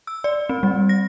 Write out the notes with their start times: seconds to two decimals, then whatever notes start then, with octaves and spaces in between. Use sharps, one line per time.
0.07 E6
0.24 D5
0.49 C4
0.63 G3
0.89 A#6